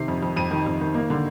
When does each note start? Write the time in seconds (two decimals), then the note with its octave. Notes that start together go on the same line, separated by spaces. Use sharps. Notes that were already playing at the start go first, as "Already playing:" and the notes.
Already playing: C3 D#3 C7
0.08 F2
0.23 F2
0.37 F2 D#7
0.51 D#3
0.67 F2
0.81 D#3
0.94 A#3
1.10 D3